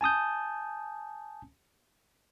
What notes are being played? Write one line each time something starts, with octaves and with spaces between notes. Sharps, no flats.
G#5 A5 D#6 G6